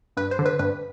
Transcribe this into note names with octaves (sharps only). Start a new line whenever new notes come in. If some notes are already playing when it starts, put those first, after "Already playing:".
G2 B4
C5
D3
B4
G2 B4